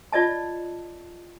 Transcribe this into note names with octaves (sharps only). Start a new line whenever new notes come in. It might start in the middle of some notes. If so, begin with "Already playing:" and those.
F4 D5 D#5 A5